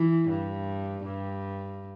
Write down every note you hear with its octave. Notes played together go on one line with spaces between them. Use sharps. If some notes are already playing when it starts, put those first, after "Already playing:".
Already playing: E3
G2
G2